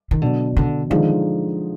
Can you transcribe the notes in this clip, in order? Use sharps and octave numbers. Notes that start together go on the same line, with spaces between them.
D#3
B2 D3 F#3 D4
D3
D3 D#3 F3 G#3 D#4